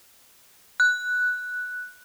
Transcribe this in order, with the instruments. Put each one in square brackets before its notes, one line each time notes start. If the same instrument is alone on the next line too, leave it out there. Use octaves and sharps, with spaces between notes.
[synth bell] F#6